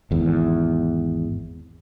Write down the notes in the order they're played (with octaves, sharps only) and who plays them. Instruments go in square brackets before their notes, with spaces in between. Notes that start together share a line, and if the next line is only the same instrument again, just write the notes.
[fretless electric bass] G#1 E2